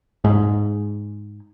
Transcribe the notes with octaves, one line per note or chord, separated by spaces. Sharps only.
G#2